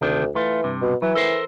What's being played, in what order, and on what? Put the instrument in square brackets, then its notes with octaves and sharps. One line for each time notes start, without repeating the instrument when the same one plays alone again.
[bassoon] D2 [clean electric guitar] C3 D#3 D4
[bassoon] E3 [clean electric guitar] A3 F4
[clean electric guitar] G2 C3
[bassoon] B2
[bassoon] E3 [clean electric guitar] F#3
[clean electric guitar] A4 A#4 C5